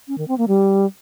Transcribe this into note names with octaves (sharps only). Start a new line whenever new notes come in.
C#4
D#3
C4
A#3
G3